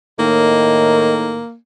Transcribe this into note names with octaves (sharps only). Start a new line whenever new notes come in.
A2 D#3 A#3